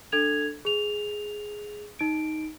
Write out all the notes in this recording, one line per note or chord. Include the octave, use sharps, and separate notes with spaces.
D4 A4 G#6 F7
G#4 F7
D#4 D7